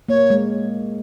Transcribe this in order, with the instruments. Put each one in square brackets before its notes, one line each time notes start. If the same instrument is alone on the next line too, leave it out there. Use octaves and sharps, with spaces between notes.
[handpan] A#3 [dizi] C#5
[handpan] G#3